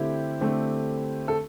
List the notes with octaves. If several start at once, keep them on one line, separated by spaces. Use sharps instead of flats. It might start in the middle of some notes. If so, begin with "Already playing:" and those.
Already playing: D3 A3 C4 E4 G4
D3 A3 C4
A4